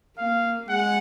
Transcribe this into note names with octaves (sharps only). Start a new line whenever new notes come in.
A#3 F5
G#3 F#5